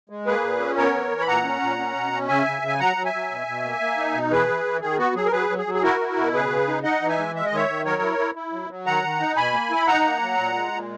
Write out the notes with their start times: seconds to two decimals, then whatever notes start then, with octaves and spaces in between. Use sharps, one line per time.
0.10 G#3
0.26 A#3 G#4 B4
0.43 A#2
0.60 C#4
0.76 B3 A#4 C#5
0.94 E3
1.11 E3
1.21 B5
1.27 A#2 F#5 A#5
1.44 C#4
1.61 A#2
1.79 C#4
1.96 B2
2.12 C#4
2.28 C#3 E5 G#5
2.46 C#3
2.62 C#3
2.68 G#5
2.79 F#3 F#5 A#5
2.97 F#3
3.05 E5 G#5
3.14 F#3
3.30 B2
3.47 B2
3.64 A#3
3.80 A#3
3.97 D#4
4.14 B2
4.31 E3 G#4 B4
4.48 E3
4.64 E3
4.81 D#3 G#4
4.98 B3 F#4
5.15 F#3 G#4
5.26 A#4
5.32 F#3 G#4 B4
5.49 F#3
5.58 G#4
5.66 F#3
5.74 G#4
5.83 E4 F#4 A#4
6.00 E4
6.17 B2
6.34 C#3 G#4 B4
6.50 C#3
6.68 D#4
6.83 D#4 D#5 F#5
7.01 E3
7.09 E5 G#5
7.18 G#3
7.34 G#3 E5
7.46 D#5
7.52 D#3 C#5 E5
7.68 D#3
7.85 F#3 A#4 C#5
8.02 E4
8.19 E4
8.35 E4
8.53 F#3
8.70 F#3
8.86 D#3 F#5 A#5
9.04 D#3
9.20 D#4
9.36 B2 G#5 B5
9.54 A#3
9.70 E4 B5
9.87 D#4 F#5 A#5
10.04 A#3
10.22 F#3
10.37 A#2
10.55 G#3
10.72 A#2